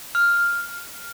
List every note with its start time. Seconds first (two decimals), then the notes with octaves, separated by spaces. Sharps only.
0.15 F6